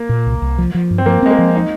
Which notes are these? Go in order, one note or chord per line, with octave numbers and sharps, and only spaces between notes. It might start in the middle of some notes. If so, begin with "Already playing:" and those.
Already playing: A#3
A#2
C2
C2
F3
F3
G2
C4
F3 A#3
G#3 C4
A#3
F3
D#4